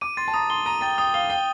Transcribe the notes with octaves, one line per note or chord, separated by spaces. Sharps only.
D6 D#7
C6 A6
A5
A#5 D#6
C6 G7
A#5 D#7
G5 A6
G5 D#6
F5 G7
G5 G7